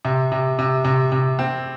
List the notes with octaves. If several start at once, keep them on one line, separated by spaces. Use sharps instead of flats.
C3
C3
C3
C3
C3
C4